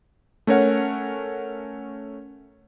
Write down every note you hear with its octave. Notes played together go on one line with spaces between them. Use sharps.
A3 C#4 A#4 C#5 F#5